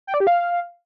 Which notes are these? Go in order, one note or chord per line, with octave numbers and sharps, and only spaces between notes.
G5
D5
G4
F5